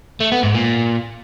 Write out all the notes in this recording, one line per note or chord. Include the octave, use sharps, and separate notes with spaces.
A3
B3
G#2
A#2